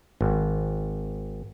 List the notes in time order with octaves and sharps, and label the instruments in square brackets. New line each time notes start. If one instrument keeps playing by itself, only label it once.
[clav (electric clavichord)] G#1